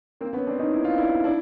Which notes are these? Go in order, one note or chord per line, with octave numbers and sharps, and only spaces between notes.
A#3 C4
B3 C#4
C4 D4
C#4 D#4
E4
F4
D4 E4
D4 E4